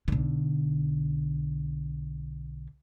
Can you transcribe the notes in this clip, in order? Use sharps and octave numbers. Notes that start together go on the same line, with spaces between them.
B1 D3